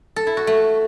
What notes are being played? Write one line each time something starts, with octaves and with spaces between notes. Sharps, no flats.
A4
E4
F#4
A3